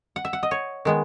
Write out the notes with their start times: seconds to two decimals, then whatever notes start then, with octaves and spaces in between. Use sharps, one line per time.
0.16 F#5
0.25 E5
0.33 F#5
0.43 D#5
0.51 C#5
0.85 D#3 G#3 B3